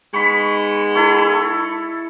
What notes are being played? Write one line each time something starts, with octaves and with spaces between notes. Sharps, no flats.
G#3 B3 D#4 B5 C#6
E4 A4 C#5